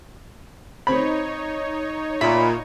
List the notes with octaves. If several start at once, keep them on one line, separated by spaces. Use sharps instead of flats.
C4 D#4 C#5 B5
A#2 E5 B5